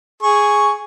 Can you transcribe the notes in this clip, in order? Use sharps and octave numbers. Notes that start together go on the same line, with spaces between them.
G#4 C#6